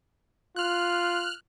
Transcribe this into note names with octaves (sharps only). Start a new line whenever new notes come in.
F4 F6 F#6